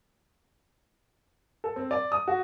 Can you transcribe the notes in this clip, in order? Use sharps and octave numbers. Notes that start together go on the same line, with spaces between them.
A4
C4
D5
D#6
F#4